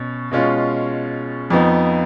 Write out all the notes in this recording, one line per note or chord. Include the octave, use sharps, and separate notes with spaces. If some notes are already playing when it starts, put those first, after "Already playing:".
Already playing: B2 C#4
B2 G#3 C#4 F4
F2 F3 B3 D#4